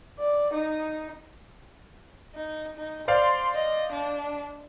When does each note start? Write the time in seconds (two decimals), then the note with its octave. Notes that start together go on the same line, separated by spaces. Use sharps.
0.19 D5
0.53 D#4
2.34 D#4
2.77 D#4
3.08 C5 D5 F5 C6
3.54 D#5
3.92 D4